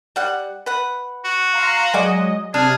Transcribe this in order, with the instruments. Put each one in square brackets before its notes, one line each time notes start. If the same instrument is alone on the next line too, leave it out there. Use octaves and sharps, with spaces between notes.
[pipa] G3 F#5
B4 F#5
[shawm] F#4
[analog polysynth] F5 A#5 C6
[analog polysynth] F#3 G#3 D#5 [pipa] D5 F#5 G#5
[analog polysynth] C3 A5 F6 [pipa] D4 [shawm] G#4